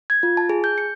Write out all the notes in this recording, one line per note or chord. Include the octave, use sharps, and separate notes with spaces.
G#6
F4
A5
G#4
G6
C#7